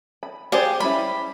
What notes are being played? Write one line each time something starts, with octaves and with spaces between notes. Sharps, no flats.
B5
G4 G#4 C5 D5
G3 C#4 E4 B5